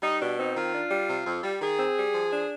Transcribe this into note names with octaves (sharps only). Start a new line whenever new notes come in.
G3 D#4
B2 D4
C4 D#4
D#3 F4
D4
G3
C3
F2
G3
D#3 G#4
C4
G3
F3
D4